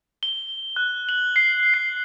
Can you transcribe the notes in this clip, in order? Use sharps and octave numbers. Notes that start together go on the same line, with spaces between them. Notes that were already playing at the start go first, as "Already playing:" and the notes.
G7
F#6
F#7
C7
C7